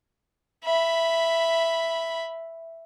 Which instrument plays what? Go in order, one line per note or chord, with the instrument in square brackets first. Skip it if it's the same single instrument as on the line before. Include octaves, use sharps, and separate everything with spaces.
[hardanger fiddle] E5 B5